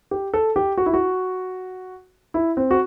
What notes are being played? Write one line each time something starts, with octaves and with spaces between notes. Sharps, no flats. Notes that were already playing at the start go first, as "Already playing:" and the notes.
G4
A4
G4
F#4
E4
F#4
E4
C4
F#4